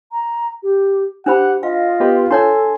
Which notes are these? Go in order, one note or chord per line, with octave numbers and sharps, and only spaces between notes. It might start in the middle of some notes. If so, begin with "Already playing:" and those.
A#5
G4
D4 G4 C5 F#5 B5
F4 D#5 F5
B3 G4 B4
D4 A4 C#5 G#5 A5 C6